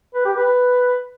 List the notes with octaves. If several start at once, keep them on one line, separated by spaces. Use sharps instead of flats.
B4
G4
B4